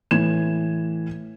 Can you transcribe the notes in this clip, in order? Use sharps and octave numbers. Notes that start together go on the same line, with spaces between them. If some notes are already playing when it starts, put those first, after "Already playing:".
A2 E3 G#6 E7